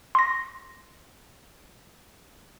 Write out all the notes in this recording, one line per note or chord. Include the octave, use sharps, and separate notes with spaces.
C6 A#6